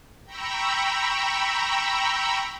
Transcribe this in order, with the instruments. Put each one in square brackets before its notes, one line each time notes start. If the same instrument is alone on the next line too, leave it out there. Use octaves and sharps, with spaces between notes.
[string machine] G5 A#5 B5 C#6 E6